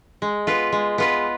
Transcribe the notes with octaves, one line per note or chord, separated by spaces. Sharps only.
G#3
B3 F4 B4
G#3
B3 F4 B4